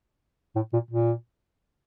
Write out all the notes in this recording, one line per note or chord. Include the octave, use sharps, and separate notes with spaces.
A2
A#2
A#2